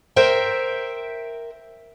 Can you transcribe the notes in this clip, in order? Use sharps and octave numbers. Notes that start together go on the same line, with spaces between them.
A#4 C5 E5 G5